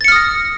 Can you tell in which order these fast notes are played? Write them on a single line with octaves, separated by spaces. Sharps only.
A6 C#7 F6 D#6 A#6